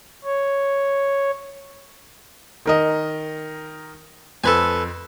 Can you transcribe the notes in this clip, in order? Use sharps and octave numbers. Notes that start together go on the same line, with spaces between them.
C#5
D#3 A#4 D#5
F2 A4 B4 G#5